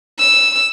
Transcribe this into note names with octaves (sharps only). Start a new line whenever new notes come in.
E6